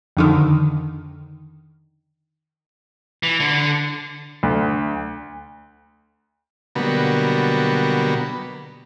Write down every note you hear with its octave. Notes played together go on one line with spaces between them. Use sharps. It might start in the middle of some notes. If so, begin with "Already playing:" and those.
F2 D3 D#3
E3
D3
D2
B2 D3 F#3 G3 A#3 B3